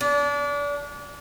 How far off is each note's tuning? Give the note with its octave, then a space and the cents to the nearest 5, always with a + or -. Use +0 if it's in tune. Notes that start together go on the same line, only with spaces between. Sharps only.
D4 -30